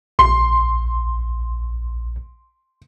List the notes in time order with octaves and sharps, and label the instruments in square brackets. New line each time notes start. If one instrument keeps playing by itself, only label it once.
[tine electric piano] A#1 [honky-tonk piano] C6